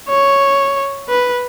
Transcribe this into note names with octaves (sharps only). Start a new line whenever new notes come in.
C#5
B4